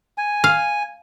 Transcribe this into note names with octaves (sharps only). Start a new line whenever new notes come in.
G#5
F5